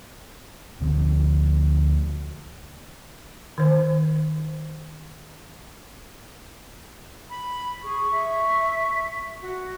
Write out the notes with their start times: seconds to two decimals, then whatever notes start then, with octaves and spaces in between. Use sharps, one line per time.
0.80 D2 D3 F3
3.58 D#3 C5
7.30 B5
7.83 G#4 C#6
8.11 E5
9.41 F#4